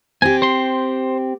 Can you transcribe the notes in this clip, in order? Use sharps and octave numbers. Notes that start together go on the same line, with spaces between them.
C4 G4 G#5
C5 C6